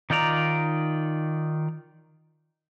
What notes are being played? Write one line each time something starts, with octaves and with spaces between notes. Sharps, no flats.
D#3 D#4 F4 D5 A#5